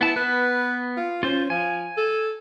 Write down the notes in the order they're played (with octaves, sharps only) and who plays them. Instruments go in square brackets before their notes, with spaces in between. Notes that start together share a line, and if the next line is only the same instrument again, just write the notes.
[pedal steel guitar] B3 A5 [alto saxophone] E4
[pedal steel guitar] B3 [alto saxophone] B4
[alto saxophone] F4
[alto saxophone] C#4 [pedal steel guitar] F4 C5
[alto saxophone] F3 [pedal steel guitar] G#5
[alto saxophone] A4